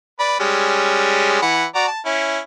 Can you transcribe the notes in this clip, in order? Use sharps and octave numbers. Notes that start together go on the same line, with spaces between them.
B4 D5 B5
G3 G#3 C#4
E3 F#5 B5
F#4 D5 A#5
A5
C#4 E4